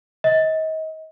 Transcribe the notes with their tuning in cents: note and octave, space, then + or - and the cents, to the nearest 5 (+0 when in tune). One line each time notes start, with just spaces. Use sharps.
D#5 +30